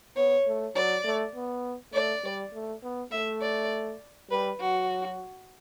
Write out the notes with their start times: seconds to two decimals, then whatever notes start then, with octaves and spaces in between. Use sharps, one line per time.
0.16 B3 C#5
0.46 A3
0.75 F#3 D5
1.05 A3
1.35 B3
1.93 A3 D5
2.24 G3
2.53 A3
2.83 B3
3.12 A3 E5
3.42 D5
4.30 G3 B4
4.60 F#3 F#4